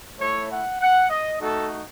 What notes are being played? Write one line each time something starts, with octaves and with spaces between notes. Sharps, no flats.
A3 E4 C#5
F#5
F#5
D#5
A3 D#4 F#4 A4